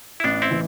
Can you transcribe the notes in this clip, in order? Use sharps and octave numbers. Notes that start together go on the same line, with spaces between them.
E4
A1 B3 D4
C4 E4
E3